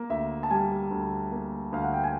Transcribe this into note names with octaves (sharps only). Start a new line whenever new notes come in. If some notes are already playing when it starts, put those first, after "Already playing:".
Already playing: A#3
D2 E5
A5
G3 G#5
D2
A#3
D2 F5
F#5
G5
G#5